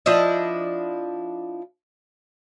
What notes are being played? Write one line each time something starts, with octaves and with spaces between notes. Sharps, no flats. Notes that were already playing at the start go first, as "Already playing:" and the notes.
F3 D4 E4 D#5